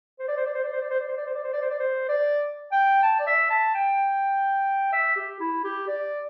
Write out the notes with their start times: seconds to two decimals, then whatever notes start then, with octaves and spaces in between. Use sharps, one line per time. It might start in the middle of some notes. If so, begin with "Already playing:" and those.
0.19 C5
0.28 D5
0.37 C5
0.46 D5
0.54 C5
0.64 D5
0.72 C5
0.81 D5
0.90 C5
0.99 D5
1.08 C5
1.17 D5
1.26 C5
1.35 D5
1.44 C5
1.53 D5
1.61 C5
1.70 D5
1.79 C5
2.08 D5
2.72 G5
3.03 A5
3.20 D5
3.27 E5
3.50 A5
3.75 G5
4.92 E5
5.16 G4
5.40 E4
5.64 G4
5.88 D5